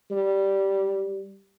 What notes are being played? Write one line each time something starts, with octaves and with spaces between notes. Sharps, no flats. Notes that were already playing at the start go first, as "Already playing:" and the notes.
G3